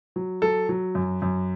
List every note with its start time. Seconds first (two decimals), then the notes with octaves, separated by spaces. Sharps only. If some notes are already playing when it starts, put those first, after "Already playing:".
0.16 F#3
0.42 F#3 A4
0.69 F#3
0.95 F#2
1.22 F#2